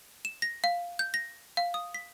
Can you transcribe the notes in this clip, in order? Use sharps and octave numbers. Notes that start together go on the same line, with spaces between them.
E7
A#6
F5
G6
A#6
F5
D#6
B6